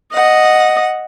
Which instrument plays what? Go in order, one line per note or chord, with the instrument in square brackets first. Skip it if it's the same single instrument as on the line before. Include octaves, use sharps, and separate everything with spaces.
[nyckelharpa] D#5 [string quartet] F#5